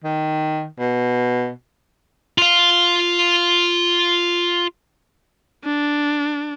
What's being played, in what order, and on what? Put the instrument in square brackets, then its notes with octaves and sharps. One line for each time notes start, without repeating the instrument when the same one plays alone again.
[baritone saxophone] D#3
B2
[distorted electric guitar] F4 F5
[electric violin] D4